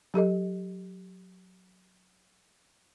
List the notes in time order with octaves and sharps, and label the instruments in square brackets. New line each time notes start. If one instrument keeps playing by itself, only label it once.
[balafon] F#3 G4 A4 D#5